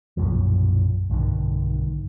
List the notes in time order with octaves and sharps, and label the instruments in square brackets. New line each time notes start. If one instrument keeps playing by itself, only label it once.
[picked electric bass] B1 F#2 A#2 F3
B1 G2 D3 D#3